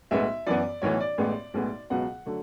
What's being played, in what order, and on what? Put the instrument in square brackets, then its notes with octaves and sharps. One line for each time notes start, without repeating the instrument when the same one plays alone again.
[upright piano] B1 A2 G#3 B3 E5
F#2 E3 B3 D5
B1 A2 E3 B3 C#5
D5
A1 A2 G#3 B3
B1 A2 G#3 B3
C#2 B2 F#3 B3 F#5
D3 F#3 A3